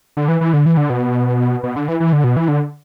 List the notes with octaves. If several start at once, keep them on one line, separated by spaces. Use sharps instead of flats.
D3
E3
E3
D3
E3
D3
B2
B2
D3
E3
E3
D3
B2
E3
D3